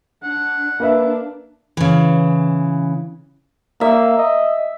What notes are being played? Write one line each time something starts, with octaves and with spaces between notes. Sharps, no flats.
D4 F#5
A#3 D4 B4 E5
C#3 E3
A#3 E5
D#5